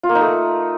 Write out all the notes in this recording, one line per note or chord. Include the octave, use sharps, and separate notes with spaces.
F4
A#3
D#4
A3